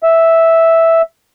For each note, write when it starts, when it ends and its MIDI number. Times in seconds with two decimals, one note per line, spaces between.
0.03 1.02 76